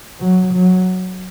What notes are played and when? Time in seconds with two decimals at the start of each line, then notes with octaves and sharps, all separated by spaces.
0.20 F#3
0.53 F#3